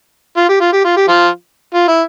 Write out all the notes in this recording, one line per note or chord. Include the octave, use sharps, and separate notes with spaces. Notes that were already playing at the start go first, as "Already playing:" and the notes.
F4
G4
F4
G4
F4
G4
F3 F4
F4
E4